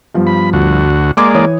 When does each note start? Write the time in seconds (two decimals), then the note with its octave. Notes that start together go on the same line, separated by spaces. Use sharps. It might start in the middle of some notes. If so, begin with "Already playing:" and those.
0.15 G2 F3 B3
0.27 B5
0.53 D2 F#4
1.17 G#3 A#3 D5 C6 D6 G#6
1.35 E3 C#5 D#6